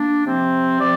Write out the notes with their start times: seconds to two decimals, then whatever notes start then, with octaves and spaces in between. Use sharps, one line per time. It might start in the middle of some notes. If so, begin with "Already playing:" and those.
Already playing: A#3 D4
0.25 C3 F3 C4
0.80 C3 F3 C4 D5